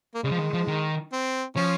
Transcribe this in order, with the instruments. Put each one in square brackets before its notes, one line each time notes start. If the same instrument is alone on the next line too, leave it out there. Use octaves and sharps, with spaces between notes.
[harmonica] A#3
[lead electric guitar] C#3 [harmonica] G#3
[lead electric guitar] F3
D#3
F3
D#3
[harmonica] C4
[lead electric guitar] F3 [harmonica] C#4